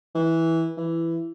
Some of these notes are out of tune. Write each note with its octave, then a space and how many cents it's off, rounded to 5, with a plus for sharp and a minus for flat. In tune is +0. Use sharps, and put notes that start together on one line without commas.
E3 -10
E3 +10